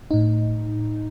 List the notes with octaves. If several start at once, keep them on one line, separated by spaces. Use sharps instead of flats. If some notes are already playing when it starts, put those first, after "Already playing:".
A2 D#4